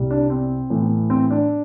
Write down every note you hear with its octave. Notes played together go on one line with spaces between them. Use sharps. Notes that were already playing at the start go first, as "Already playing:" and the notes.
Already playing: C2 C3 G3
D4
C4
A2 E3 B3
C4
D4